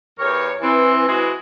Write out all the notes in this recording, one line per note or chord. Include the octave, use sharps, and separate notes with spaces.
E2 G4 A#4 C#5
E3 C4
E3 G#3 C4 E4 F#4 G#4